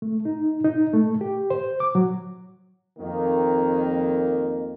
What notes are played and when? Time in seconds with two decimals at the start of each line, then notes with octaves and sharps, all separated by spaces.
0.02 A3
0.25 D#4
0.65 D#4
0.93 A3
1.21 G4
1.50 C5
1.80 D6
1.95 F#3
2.99 F2 D#3 A#3